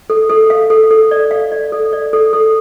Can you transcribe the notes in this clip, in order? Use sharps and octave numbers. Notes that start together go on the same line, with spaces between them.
A4
A4
F5
A4
A4
D5
F5
D5
A4
D5
A4
A4